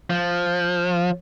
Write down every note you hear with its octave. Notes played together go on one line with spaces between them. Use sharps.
F3